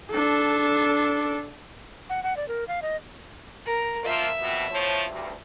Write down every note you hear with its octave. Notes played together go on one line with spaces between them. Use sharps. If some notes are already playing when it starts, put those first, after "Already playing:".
D4 A4
F#5
F#5
D5
A#4
F5
D#5
A#4
F3 A#3 F4 E5
F2 B2
A2 F3 C#5
D2 G2